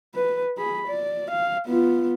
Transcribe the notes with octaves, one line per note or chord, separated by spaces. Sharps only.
B4
G#4 B5
D5
F5
B3 F4